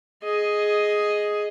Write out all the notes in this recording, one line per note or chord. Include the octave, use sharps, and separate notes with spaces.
G#4 D#5